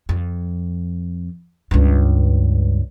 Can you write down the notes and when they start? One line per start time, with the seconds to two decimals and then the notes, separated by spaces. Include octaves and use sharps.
0.09 F2
1.71 C#2 G2